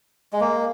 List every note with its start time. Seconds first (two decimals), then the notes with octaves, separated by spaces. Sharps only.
0.33 G#3
0.41 A#3